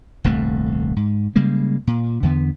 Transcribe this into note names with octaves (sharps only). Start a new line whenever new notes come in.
D#1 C2 G2 A3
G#2
C#3 G3 G#3 A#3
A#2
E2 D3 B3